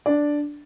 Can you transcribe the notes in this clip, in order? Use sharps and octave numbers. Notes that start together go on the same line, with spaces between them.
D4 D5